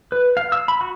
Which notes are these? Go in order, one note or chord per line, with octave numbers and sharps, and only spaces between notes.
B4
F5
E6
B5
F#4